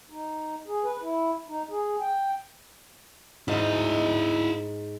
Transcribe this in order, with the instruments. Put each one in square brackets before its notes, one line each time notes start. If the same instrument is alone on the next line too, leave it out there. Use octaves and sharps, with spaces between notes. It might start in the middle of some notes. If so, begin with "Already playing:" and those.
[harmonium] D#4
G#4
B4
E4
D#4
G#4
G5
[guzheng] G#2 [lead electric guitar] E4 D#5